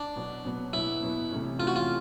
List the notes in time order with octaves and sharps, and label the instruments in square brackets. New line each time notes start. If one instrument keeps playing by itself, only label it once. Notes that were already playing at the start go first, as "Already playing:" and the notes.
Already playing: [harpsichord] D4
[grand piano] B2 F#3 B3
B2 F#3 B3
[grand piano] B2 F#3 B3 [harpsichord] E4
[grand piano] B2 F#3 B3
C3 E3 A3 C#4
[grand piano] C3 E3 A3 C#4 [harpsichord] F4
[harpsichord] F#4
F4